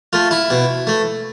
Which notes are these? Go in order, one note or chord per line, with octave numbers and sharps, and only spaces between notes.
A3 F4
E4
B2
A3